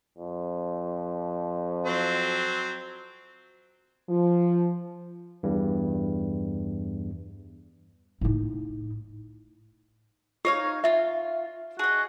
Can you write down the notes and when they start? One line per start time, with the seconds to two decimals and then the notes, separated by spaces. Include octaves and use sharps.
0.18 F2
1.86 F#3 C4
4.08 F3
5.43 E2 G2
8.21 A2 D#4
10.45 D#4 G4 C#5 F5
10.84 F4 E5 F5
11.79 F#4 G#4 D#5